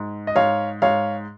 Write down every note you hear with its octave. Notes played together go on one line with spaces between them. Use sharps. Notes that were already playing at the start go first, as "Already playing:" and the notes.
Already playing: G#2
D#5
G#2 C#5 F5
G#2 C#5 F5